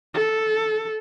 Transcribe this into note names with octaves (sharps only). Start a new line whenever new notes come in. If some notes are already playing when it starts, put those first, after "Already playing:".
A4